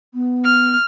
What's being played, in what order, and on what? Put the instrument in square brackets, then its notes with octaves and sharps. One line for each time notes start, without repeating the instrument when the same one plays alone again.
[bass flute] B3
[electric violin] F6